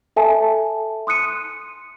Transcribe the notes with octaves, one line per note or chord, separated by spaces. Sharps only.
A4 E5 G#5 A5
C6 D#6 F#6 C#7 D#7